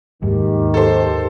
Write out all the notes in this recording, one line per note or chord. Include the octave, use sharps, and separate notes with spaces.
D#2 G#2 D#3 G4
A4 C5